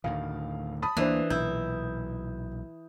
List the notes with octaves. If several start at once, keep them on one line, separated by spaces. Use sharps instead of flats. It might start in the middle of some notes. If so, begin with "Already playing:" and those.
D2 A2 D#3 F5
A5 B5 D#6
D2 E3 A#3 D4 C5
B1 A#2 E4 G6